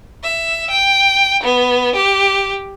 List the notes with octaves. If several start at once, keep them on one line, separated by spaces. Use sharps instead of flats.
E5
G5
B3
G4